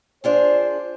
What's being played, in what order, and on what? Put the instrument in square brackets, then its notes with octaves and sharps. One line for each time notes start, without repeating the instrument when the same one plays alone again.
[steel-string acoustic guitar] D4 F4 G#4 [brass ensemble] C5